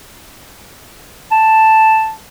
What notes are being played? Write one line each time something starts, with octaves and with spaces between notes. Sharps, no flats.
A5